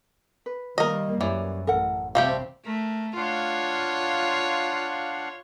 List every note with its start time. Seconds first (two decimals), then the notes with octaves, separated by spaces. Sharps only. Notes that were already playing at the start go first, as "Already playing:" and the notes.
0.46 B4
0.78 D#3 G3 A#3 A#4 D#5
1.21 F#2 E3 G4 C#5 D5
1.67 A1 A4 A#4 F#5
2.15 C3 G3 A3 C4 G4 F5
2.66 A3 A#4
3.16 D4 F4 C#5 F5 F#5